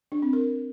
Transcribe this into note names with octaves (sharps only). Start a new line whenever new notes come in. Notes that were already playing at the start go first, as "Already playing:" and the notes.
D4
C4
A#4